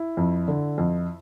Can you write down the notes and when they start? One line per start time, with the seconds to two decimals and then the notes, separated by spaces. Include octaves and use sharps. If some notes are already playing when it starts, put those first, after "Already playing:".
Already playing: E4
0.17 F2
0.48 D3
0.78 F2